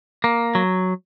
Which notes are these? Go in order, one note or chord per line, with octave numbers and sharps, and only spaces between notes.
A#3
F#3